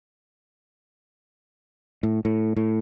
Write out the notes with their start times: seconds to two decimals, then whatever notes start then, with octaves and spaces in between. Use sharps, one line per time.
2.03 A2
2.25 A2
2.57 A2